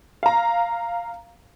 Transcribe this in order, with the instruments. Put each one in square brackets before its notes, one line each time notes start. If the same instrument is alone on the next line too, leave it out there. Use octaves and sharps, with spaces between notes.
[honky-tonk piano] F5 A#5